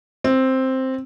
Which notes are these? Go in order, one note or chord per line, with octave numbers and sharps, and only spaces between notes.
C4